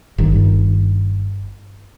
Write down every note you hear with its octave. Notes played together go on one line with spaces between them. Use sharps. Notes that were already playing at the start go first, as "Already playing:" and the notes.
G1 D#3